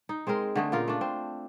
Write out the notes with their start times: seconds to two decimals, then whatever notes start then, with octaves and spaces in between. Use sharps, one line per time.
0.09 D#4
0.27 G#3 C4 G#4 A#4
0.56 D3 A3 G#4
0.72 A#2 C#3 F4 A#4
0.88 A3 D4
1.01 C4